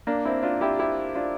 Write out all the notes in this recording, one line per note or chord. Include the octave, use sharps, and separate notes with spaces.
A#3 D4
C4 E4
D4 F4
E4 G4
E4 G4
D4 F4